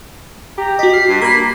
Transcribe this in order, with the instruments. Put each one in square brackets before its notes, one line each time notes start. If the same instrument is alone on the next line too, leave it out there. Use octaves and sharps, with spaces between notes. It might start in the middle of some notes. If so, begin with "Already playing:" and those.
[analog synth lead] G4 [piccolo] A#5
[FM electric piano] F#4 D#5 [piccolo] B6
[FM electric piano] F6 [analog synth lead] C7
[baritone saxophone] G2
[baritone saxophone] A#3 [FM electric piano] A#5 B5